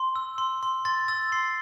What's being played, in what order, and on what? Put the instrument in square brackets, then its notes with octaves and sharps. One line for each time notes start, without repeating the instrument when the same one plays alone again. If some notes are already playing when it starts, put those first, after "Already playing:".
Already playing: [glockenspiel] C6
E6
C6
C6
C6 A6
E6 A6
C6 C7